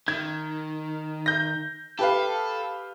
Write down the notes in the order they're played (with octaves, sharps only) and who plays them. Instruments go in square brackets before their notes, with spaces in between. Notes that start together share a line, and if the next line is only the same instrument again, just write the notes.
[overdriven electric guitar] D#3 [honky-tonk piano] G#6
[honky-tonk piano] G6 A#6
[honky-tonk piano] G4 B4 F5 [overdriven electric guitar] A4